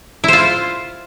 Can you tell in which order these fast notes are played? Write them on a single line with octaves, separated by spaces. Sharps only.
E4 C5 F4